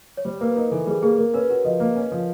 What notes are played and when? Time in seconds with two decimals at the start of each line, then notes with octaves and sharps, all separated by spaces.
0.17 C#5
0.25 G3 C5
0.41 A#3 B4
0.56 D#4 A#4
0.71 E3 A4
0.87 G3 G#4
1.02 A#3 G#4
1.18 A#3 A#4
1.34 C#4 B4
1.49 F#4 B4
1.64 F3 D#5
1.80 A#3
1.96 C#4
2.12 F3